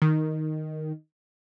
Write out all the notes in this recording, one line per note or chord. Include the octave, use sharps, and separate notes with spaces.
D#3